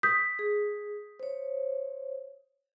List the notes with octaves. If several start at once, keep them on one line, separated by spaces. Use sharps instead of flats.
D#6 G6 B6
G#4
C5 C#5